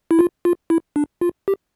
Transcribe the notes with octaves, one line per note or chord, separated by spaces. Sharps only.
E4
F4
F4
E4
D4
F4
G4